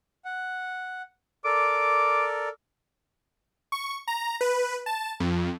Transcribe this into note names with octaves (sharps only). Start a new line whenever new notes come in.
F#5
A4 A#4 D5 D6
C#6
A#5
B4
A5
F2